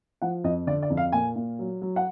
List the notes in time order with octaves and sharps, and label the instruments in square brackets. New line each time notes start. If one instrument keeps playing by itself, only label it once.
[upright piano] F3 F#5
F2 D#5
D3 D5
D5
F2
F5
A#2 G#5
A#2
F#3
F#3
F#5